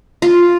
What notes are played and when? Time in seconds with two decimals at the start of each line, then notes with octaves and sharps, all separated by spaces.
0.22 F4